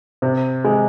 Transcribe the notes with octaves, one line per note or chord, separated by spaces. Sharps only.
C3
G#3